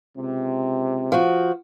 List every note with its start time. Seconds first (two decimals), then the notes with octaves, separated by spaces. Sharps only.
0.17 C#2 C3
1.12 F3 F#4